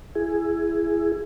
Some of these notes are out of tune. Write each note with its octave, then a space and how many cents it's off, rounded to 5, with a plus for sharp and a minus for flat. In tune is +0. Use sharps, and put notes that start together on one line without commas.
E4 +20 G#4 +0